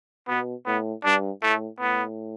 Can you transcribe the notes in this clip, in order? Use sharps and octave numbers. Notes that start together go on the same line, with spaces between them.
B2 B3
A2 B3
G2 D4
A2 A3
A2 B3